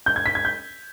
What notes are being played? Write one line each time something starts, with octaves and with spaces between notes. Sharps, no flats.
G6
G#6
B6
G#6
G6